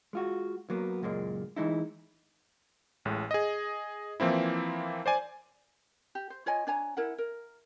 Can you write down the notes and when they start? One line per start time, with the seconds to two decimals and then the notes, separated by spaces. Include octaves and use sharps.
0.13 G#3 F4 F#4
0.70 F#3 A#3 B3
1.02 C#2 F#2 A#2 G#3 A#3
1.56 E3 G#3 D#4 E4
3.05 A1 A2 G#3
3.31 G#4 D#5
4.20 E3 F3 A#3 C4 E4
5.06 C5 D5 G#5
6.15 G4
6.30 C5
6.46 F4 C#5 D#5 G#5
6.67 D4 C#5 G#5 A#5
6.97 E4 A#4 F#5
7.18 A#4